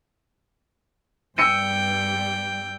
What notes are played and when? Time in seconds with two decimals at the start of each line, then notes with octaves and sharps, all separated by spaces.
1.38 G2 G3 G5 E6 C#7 D#7